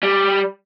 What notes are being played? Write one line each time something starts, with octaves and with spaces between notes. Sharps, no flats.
G3